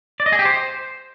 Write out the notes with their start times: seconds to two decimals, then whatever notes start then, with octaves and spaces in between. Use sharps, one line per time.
0.20 D5
0.26 D#5
0.33 G#4
0.39 G4
0.45 C5